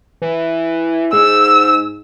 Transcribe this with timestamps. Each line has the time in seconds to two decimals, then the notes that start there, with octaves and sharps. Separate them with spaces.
0.22 E3
1.13 G#2 E6